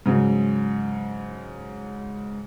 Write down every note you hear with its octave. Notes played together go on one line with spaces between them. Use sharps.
G#2 C#3 F#3